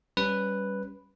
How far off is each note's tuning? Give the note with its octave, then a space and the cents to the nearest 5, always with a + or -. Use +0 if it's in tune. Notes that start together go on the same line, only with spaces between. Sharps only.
G3 +0 C#4 +0 B4 +0